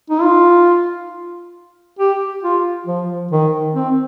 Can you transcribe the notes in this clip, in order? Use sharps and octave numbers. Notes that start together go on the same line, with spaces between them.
D#4
F4
G4
F4
F3
D#3
C4